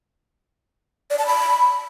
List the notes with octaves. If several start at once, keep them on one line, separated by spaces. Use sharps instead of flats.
D5
A5
B5